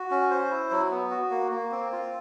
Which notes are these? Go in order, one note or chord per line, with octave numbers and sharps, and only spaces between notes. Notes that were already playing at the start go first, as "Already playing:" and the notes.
Already playing: F#4
C#4
C5
E4
F#3
B3
F#4
A#3
A#3
C4
F4